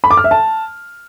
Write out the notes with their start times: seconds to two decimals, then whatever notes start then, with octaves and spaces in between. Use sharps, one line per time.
0.04 B5
0.11 D6
0.17 F6
0.24 E5
0.31 A5